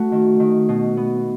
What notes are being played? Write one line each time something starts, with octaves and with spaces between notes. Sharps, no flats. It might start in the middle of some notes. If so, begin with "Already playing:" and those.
Already playing: A3 F#4
D#3
D#3
B2
B3